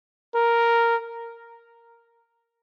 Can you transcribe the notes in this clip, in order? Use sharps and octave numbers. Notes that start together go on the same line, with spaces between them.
A#4